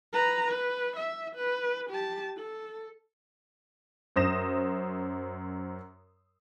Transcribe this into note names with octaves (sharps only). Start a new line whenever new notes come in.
B4 A#5
B4
E5
B4
G4 A5
A4
F#2 C5 D#6 A#6 E7